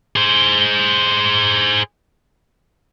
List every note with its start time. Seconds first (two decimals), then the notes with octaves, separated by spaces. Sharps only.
0.16 G#4 C5